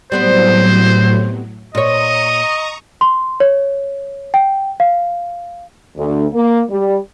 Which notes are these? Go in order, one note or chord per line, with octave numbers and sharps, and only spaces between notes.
A2 F#3 G3 B3 C4 C5
A#2 C#5 D#5 A#5 C#6 D#6
C6
C#5
G5
F5
D2
A#3
G3